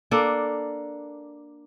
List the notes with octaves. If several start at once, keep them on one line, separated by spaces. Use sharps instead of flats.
A#3 D4 A4